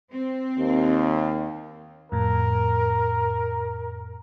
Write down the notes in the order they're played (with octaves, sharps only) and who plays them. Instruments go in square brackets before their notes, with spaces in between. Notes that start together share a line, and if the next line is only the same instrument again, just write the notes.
[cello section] C4
[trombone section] D#2
[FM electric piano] F2 A2 [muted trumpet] A#4